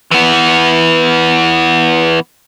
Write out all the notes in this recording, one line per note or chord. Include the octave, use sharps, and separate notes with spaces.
E3 B3